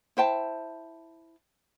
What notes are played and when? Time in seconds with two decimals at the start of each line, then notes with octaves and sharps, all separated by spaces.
0.17 E4 C5 G5 A5